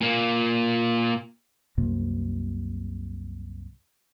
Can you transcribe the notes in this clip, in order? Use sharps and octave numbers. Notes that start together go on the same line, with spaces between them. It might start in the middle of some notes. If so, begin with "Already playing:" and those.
A#2 A#3
C2 F#2 C3 A#3